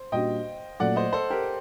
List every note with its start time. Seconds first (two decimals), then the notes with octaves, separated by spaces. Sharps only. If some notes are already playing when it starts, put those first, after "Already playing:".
Already playing: C5
0.12 A#2 G3 D4 F#4 D#5 G5
0.80 A#2 F#3 A3 D5 F#5
0.96 C5 D#5
1.13 A4 C5
1.30 G4 A#4